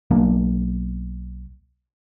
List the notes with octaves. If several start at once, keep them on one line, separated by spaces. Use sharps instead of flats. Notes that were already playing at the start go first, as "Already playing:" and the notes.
B1 F#3 A#3 D4